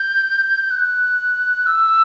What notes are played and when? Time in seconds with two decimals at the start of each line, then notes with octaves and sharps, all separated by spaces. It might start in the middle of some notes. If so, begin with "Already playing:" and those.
Already playing: G6
0.71 F#6
1.66 E6